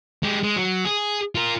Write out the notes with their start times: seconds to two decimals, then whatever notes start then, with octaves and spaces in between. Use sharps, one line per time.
0.23 G#3 G4
0.43 G#3
0.56 F#3
0.85 G#4
1.35 F4 A#4